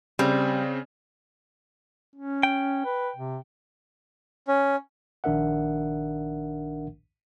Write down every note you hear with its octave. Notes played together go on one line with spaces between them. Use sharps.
C#3 G3 C4
C#4
G5
B4
C3
C#4
A#1 D#3 D4 A#4 E5 F#5